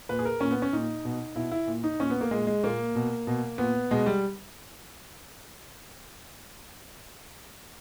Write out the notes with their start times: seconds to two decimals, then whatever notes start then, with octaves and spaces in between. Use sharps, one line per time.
0.09 A#2 B4
0.19 G#4
0.25 A#4
0.40 A#2 C#4
0.51 B3
0.62 C#4
0.73 A#2 D#4
1.05 B2
1.35 B2 E4
1.52 E4
1.67 A#2
1.84 D#4
1.99 A#2 C#4
2.10 B3
2.21 A#3
2.31 A#2 G#3
2.47 G#3
2.63 A#2 A#3
2.96 B2
3.27 B2
3.58 A#2 B3
3.91 B2 G#3
4.06 G3